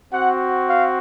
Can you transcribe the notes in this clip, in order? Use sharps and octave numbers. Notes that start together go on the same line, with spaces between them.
C4 F#4 F#5
F5